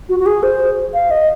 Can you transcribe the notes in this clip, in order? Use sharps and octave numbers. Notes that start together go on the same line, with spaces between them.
F#4
F#4
G#4
C5
F5
D#5